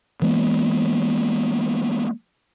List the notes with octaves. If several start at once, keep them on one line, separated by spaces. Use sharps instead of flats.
E3 G#3 A#3 B3